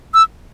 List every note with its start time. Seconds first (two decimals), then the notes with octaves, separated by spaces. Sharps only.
0.14 E6